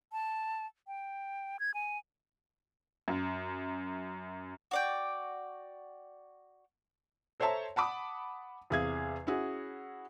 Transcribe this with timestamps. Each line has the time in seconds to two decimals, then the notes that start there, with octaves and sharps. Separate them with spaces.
0.12 A5
0.87 G5
1.60 G#6
1.74 G#5
3.08 F#2
4.71 F#4 D5 G5
7.40 A4 C5 C#5 E5 A5 A#5
7.76 F#5 A5 B5 D6 D#6
8.70 E2 C3 G#4 F5 G#6
9.27 C#4 E4 F#4 G#4